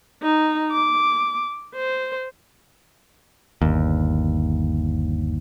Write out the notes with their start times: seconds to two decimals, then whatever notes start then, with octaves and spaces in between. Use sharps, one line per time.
0.23 D#4
0.72 D6
1.75 C5
3.62 G1 D#2